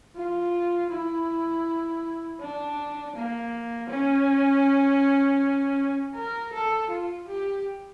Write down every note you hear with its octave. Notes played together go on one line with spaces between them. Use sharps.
F4
E4
D4
A#3
C#4
A#4
A4
F4
G4